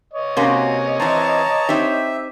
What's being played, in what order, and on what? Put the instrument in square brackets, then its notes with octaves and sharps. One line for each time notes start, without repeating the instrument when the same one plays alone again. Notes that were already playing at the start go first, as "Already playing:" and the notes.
[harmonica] C#5 D#5
[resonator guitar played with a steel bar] C3 A#3 C#4 [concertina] F#4
[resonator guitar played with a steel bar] E3 C4 [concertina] A5 A#5
[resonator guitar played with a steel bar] C4 D#4 G4 [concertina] E5